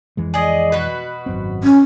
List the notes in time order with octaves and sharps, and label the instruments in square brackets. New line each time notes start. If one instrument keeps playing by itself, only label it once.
[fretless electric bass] F2 E3 G#3
[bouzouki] G#4 D5 D#5
B2 F#4 B4
[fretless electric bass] G#1 F#2 C4
[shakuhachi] C#4